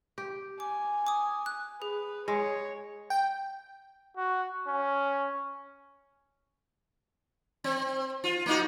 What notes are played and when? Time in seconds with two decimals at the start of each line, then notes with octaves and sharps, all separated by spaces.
0.18 G4
0.60 G#5 D6
1.07 D6 D#6
1.46 F#6
1.82 G#4 B4
2.28 G#3 C#5
3.10 G5
4.17 F#4
4.67 C#4
7.64 C4
8.24 F4
8.46 A#3 D#4 F#4